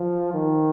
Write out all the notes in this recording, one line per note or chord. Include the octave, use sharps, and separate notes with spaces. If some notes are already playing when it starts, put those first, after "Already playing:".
Already playing: F3
D#3